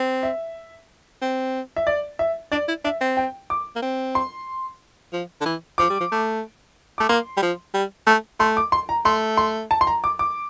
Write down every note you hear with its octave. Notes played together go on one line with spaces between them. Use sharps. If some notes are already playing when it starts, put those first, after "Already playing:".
Already playing: C4
E5
C4
E5
D5
E5
D4 D5
E4
D4 E5
C4
G5
D6
A#3
C4
C6
F3
D3
E3
F3 D6
G3
F3
A3
A3 D6
A#3 C6
G3
F3
G3
A3
A3 C6
D6
C6
A#5
A3 C6
C6
A5
C6
A#5
D6
D6